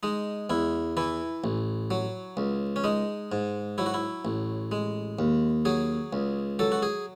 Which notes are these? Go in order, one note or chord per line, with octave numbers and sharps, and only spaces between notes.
G#3 D#4
E2 E4
E3 E4
A1
F#3
C#2
C#4
G#3 D#4
G#2
F#3 E4
F#4
E4
A1
G#3
D#2
F#3 G#4
C#2
F#3 A4
F#4
G#4